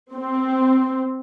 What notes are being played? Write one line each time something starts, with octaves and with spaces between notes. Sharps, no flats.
C4